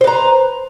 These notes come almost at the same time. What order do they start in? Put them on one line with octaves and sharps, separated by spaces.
C5 B4 A#5